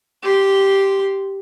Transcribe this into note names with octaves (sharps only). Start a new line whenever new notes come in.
G4 C6